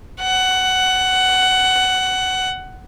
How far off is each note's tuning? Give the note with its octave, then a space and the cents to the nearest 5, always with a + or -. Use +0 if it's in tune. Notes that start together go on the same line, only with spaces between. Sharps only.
F#5 +15